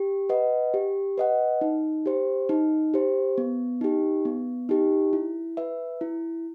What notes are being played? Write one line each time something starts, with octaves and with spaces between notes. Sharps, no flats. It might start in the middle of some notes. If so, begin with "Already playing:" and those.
Already playing: G4
B4 D#5 F#5
G4
B4 D#5 F#5
D#4
G4 C5
D#4
G4 C5
B3
D#4 G4
B3
D#4 G4
E4
B4 E5
E4